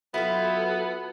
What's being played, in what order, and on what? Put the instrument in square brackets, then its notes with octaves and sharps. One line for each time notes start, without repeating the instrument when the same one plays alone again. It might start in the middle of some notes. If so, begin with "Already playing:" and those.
[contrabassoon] F#3 [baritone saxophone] B3 [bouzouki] E4 F4 [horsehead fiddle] A4